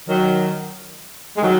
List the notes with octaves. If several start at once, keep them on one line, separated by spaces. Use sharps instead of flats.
D#3 F#3
G#3
D#3 F#3